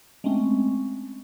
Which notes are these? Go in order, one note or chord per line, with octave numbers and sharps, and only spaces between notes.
G#3 A3 C4 C#4